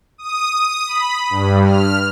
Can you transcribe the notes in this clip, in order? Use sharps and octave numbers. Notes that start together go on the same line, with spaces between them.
D#6
D#6
B5
G2
F6